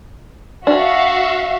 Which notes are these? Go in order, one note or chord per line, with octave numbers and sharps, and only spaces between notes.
D4 F#4 E5 F5